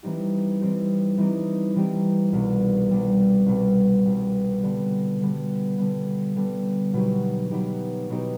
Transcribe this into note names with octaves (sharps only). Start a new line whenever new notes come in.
E3 G3 C4 D#4 G4
E3 G3 C4 D#4 G4
E3 G3 C4 D#4 G4
E3 G3 C4 D#4 G4
C2 B2 G3
C2 B2 G3
C2 B2 G3
C2 B2 G3
D3 G3 B3
D3 G3 B3
D3 G3 B3
D3 G3 B3
B2 F#3 B3 D#4 G4
B2 F#3 B3 D#4 G4
B2 F#3 B3 D#4 G4